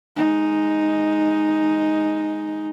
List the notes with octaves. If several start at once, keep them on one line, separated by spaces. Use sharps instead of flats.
G#3 D#4